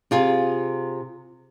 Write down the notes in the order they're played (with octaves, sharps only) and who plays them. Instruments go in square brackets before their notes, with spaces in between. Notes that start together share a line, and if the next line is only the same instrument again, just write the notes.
[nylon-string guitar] C3 F4 G#4